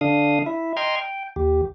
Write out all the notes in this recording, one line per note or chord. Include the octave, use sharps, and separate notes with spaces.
D3 D4 F5 D#6
E4 E5
D#5 G5 A#5 C6 F6 G#6
G5
D#2 G4